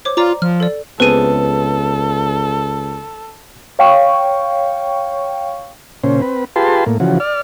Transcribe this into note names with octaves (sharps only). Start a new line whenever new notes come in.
C5 C#5 D6
F4 D5 A#5 D6
F3 F6
A4 D5
C#2 B3 C4 G#4 A4 B4 D#7
C#5 F5 G5 C#6
A#2 C#3 C#4 C5
C4 B4
F4 G4 G#4 B4 A5 C6
A2 A#3
C#3 E3 F3 F#4
D5 F6